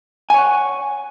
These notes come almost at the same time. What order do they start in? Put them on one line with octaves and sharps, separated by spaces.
G#5 C#5 F#5